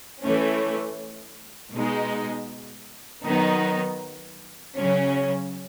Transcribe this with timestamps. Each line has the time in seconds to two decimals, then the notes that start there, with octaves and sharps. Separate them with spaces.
0.22 E3 A3 C#4
1.73 B2 G#3 D#4
3.25 D#3 F#3 B3 D#4
4.76 C#3 F#3 C#4